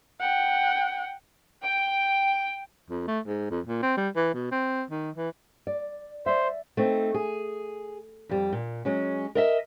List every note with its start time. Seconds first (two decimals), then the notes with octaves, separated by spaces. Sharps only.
0.20 F#5 G5
1.63 G5
2.90 F2
3.07 A3
3.27 G#2
3.50 F2
3.67 A#2
3.83 C4
3.97 G3
4.16 E3
4.34 B2
4.51 C4
4.91 D#3
5.16 E3
5.67 D5
6.26 C5 D5 E5
6.77 A3 C4 D#4
7.14 G#4
8.29 F2 G3
8.52 A#2
8.85 F#3 G#3 C#4
9.35 A#4 D#5 E5